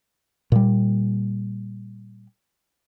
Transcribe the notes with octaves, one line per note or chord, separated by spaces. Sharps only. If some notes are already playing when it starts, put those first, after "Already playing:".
A#2 G3